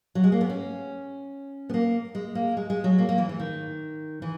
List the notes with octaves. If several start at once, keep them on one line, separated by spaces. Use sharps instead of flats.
F#3
G#3
A#3
B3
C#4
B3
A#3
G#3
A#3
G#3
G#3
F#3
A#3
A#3
E3
E3
D#3
E3